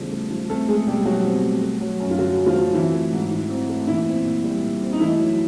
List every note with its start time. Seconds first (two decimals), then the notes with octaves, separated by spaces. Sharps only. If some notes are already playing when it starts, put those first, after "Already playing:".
Already playing: E2 C#3 F3 G3 A3
0.12 A3
0.30 F3
0.50 A3 C4 A4
0.68 G#3 A3 G#4
0.87 B2 G3 G4
1.06 F#3 F#4
1.25 C4
1.43 A3
1.62 A3
1.81 F#3
2.00 F#2
2.11 F4
2.18 D3 F#3 F#4
2.38 A3
2.46 F3 F4
2.56 F#3
2.74 E3 C4 E4
2.93 A3
3.13 G#2
3.31 E3
3.49 C4
3.69 A3
3.87 A#2 E3 E4
4.07 C4
4.25 A#2
4.44 G3
4.63 A#2
4.82 C4
4.93 D#4
5.00 E3 A3 E4
5.19 F#3